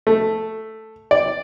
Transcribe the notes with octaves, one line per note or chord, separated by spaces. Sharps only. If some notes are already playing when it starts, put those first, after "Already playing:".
A3
D5